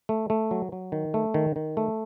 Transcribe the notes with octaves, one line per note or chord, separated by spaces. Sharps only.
A3
A3
F#3
F#3
D#3
A3
D#3
D#3
A3